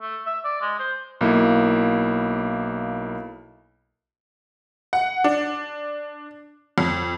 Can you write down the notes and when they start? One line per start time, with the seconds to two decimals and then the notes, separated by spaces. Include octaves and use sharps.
0.01 A3
0.26 E5
0.45 D5
0.62 G#3
0.80 C5
1.21 B1 A#3 E4
4.93 F#5
5.24 D4
6.78 F2